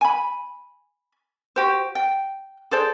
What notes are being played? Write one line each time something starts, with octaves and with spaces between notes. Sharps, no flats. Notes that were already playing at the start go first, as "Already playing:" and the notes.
G#5 B5
F#4 G4 C5
G5
G#4 A4 C5 D5